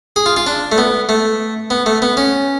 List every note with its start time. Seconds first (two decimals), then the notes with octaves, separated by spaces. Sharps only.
0.16 G#4
0.26 F4
0.36 F4
0.46 D4
0.72 A3
0.78 B3
1.09 A3
1.70 B3
1.86 A3
2.02 B3
2.17 C#4